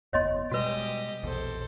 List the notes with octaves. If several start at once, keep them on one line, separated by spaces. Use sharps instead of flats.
F#1 E2 B3 C#5 D#5 C6
B2 G3 G#3 F#4 G4 B4 D#5
A#1 E2 B2 A4 C5